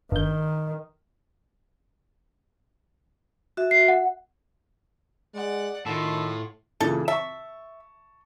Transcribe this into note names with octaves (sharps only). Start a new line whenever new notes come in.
G1 D#3 G6
F#4 E5
C7
F#5
G#3 D5 F#5
A2 D#3 F4 A4
A#2 C#3 E3 A4
E5 A5 C#6